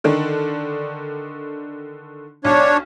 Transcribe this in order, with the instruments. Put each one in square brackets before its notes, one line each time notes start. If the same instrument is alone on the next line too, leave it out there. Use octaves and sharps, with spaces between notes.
[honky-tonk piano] D3 D#3 D4
[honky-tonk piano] B1 [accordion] D4 C#5